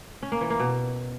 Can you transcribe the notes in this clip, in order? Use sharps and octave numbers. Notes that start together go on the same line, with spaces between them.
C#4
A#3
E3
A#3
B2